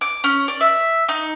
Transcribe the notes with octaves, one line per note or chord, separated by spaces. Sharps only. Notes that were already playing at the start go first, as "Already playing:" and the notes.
D6
C#4
D5
E5
D#4